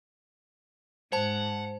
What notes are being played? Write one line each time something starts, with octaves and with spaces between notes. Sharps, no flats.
G#2 C5 F#5 A5